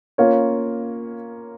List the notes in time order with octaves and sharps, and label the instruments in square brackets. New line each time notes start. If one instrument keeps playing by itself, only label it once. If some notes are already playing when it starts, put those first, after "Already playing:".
[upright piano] A#3 C#4 F4 A#4 C#5